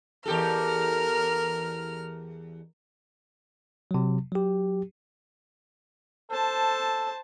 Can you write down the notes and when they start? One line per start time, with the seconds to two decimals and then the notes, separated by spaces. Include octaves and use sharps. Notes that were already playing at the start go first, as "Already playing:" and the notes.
0.26 E2 G4 A4 A#4 F6
3.91 C3 F#3
4.32 F#3 G4
6.31 A4 C5 A5